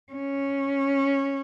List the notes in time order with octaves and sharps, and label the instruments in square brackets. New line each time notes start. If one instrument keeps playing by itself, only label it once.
[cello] C#4